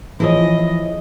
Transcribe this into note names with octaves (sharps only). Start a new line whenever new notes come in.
E3 F3 E4 G#4 C#5 D#5